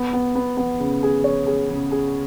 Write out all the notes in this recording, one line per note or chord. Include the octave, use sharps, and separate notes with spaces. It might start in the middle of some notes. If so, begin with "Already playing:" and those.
Already playing: B3
B3
B3
B3
C#3
G#4
C#5
G#4
C#3
G#4